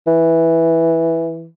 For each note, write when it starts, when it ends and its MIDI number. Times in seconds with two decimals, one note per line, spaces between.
0.07 1.47 52